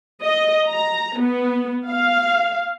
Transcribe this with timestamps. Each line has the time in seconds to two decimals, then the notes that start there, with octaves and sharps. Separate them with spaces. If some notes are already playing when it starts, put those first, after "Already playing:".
0.25 D#5
0.68 A#5
1.19 B3
1.90 F5